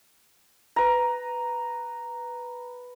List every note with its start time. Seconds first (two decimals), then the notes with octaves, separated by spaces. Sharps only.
0.76 B4 A#5